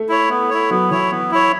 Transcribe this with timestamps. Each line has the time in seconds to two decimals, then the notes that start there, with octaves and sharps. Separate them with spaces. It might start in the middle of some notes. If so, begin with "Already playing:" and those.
Already playing: A3
0.09 E4 C#5
0.30 B3
0.50 E4 C#5
0.70 F#3 B3
0.91 E3 E4 C#5
1.11 B3
1.31 E4 C#5